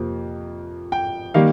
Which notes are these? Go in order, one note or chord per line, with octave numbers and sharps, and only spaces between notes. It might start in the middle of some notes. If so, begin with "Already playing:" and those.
Already playing: F2 C3 F3 A#3
G5
D#3 G3 A#3 F5